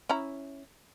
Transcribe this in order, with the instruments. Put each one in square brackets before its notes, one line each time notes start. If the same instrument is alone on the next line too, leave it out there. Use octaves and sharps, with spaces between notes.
[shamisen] C#4 E4 A#5